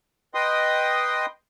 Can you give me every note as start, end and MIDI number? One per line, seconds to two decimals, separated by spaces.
0.34 1.26 71
0.34 1.26 75
0.34 1.26 79
0.34 1.26 84
0.34 1.26 87